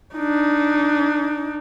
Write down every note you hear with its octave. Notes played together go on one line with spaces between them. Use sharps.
D4 D#4